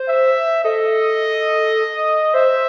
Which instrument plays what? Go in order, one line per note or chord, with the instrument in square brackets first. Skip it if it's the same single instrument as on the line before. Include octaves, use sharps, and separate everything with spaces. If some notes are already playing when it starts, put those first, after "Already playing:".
Already playing: [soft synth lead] C5
[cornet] E5
[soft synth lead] A4 [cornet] D#5
[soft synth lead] C5 [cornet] E5